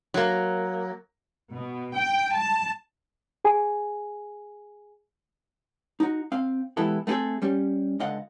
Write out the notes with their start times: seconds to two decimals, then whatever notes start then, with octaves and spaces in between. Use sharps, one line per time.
0.14 F#3 A#3
1.53 B2
1.96 G5
2.36 A5
3.45 G#4 G#5
6.00 D#4 F#4
6.32 C4 F5
6.77 E3 G#3 B3 E4 G4 A4
7.07 A3 B3 C4 G#4 A4
7.42 G3 C#4 G4
8.00 C#2 D3 D#5 F5 F#5